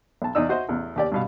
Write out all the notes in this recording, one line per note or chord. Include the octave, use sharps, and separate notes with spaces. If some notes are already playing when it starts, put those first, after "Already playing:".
B1 A5
E2 D#4 D5 E6
F#4 C5 D#5 E5
A1 E2
D#2 G4 D5
G2 B2 F5